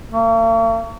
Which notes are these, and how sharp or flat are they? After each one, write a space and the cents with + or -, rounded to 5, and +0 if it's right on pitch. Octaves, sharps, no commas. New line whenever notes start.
A#3 -45